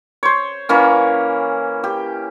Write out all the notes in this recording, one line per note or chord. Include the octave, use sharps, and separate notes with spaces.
C5 C#5
E3 A#3 C#4
G4